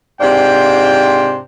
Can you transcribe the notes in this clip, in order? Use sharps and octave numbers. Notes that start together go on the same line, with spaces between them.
G#2 C3 D4 F4 C5 G5